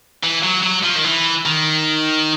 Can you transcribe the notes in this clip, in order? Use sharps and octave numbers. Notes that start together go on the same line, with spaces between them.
E3
F#3
F#3
F3
D#3
E3
D#3